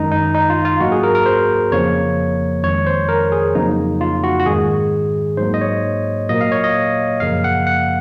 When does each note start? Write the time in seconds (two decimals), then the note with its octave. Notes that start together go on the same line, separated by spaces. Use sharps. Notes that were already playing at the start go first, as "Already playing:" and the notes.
Already playing: F#2 D#3 G#3 D#4
0.12 D#4
0.35 D#4
0.50 F4
0.65 F4
0.80 G#2 F#3 A#3 F#4
0.92 G#4
1.03 A#4
1.15 A#4
1.26 C5
1.71 F2 C#3 F3 A#3 C#5
2.63 F2 D#3 G#3 C#5
2.87 C5
3.09 A#4
3.32 G#4
3.55 F2 C#3 F#3 A#3 D#4
4.01 F4
4.24 F#4
4.40 F#4
4.46 G#2 D#3 G#3 G#4
5.37 G#2 F#3 A#3 C5
5.54 D#5
5.61 C#5
6.29 A#2 F#3 A#3 D#5
6.41 F5
6.52 C#5
6.64 D#5
7.20 F#2 C#3 F3 A#3 F5
7.44 F#5
7.67 F#5